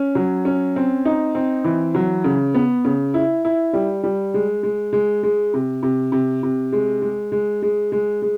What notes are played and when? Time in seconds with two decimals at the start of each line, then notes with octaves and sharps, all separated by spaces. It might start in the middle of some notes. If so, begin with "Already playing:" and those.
Already playing: C#4
0.15 F#3
0.45 C#4
0.76 C4
1.05 D#4
1.35 C4
1.64 E3
1.95 F#3
2.24 C#3
2.54 B3
2.85 C#3
3.14 E4
3.45 E4
3.73 G3
4.03 G3
4.34 G#3
4.63 G#3
4.93 G#3
5.23 G#3
5.54 C3
5.83 C3
6.12 C3
6.43 C3
6.72 G#3
7.02 G#3
7.32 G#3
7.62 G#3
7.92 G#3
8.22 G#3